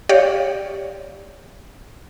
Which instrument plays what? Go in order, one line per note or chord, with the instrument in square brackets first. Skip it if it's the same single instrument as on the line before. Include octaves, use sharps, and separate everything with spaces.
[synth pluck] G4 C#5 D5 F5